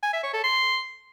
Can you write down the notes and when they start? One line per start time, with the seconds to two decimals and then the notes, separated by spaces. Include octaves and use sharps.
0.03 G#5
0.13 E5
0.23 C#5
0.33 A4
0.44 C6